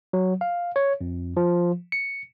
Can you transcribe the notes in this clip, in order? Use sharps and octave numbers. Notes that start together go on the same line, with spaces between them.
F#3
F5
C#5
F2
F3
C#7